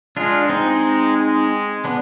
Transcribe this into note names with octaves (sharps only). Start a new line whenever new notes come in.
G#3 D4 F4
G#3 C4 D#4
G#3
B3 D4